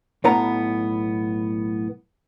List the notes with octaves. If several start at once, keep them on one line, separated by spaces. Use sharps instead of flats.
B1 A2 B3 B4 A#5